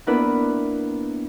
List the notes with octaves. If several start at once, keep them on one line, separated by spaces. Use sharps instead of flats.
A#3 B3 D4 E4 B4